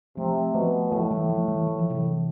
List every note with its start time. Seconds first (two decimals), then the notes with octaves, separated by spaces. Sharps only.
0.17 C3 F3 A3
0.54 B2 F3 A3
0.92 A2 F3 A3
1.11 E3 G3
1.29 F3 A3
1.48 E3 G3
1.67 E3
1.79 F3
1.90 C3 E3